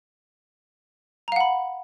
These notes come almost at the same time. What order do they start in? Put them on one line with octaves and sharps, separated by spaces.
A#5 F5 F#5 B5